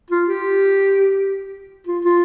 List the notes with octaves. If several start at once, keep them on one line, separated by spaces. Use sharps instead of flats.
F4
G4
F4
F4